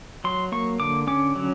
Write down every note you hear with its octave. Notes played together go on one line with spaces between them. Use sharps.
F#3 C6
A#3 C#6
D3 D6
C#4 D6
F#3